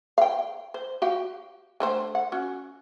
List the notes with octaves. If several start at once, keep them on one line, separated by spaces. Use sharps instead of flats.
F5 G5
C5
F#4 G4 F5
D3 A3 C5
F#5
C#4 F#4